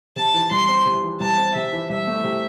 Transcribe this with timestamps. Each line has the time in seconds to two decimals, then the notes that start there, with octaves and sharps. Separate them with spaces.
0.16 C3 A5
0.34 E3
0.51 C2 C6
0.69 C4
0.86 C3
1.03 E3
1.20 C2 A5
1.38 C4
1.55 C3 E5
1.73 E3
1.90 C2 E5
2.07 A3
2.24 C3